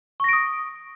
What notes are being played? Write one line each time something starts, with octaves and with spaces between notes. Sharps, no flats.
C#6 D#6 A#6 D7